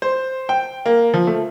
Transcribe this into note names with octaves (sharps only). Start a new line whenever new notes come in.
C5
G5
A#3
F3
A3